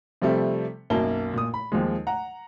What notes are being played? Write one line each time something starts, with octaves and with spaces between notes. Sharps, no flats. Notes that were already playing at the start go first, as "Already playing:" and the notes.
C3 F3 G3 A3
B1 F#2 A#3 A5 G7
A#2 D#6
B5
D#2 F3 G#3
F#5 A#5